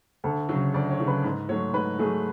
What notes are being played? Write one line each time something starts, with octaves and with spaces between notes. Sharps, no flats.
D2 A4
C#3 F#3
D2 D5
C#5
C#3 F#3
B4
G#2 B4
F#3 A3 C#5
G#2 B4
F#3 A3 G#4